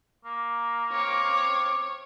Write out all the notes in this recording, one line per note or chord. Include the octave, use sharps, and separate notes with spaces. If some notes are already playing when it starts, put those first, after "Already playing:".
A#3
C4 C#5 F5 D6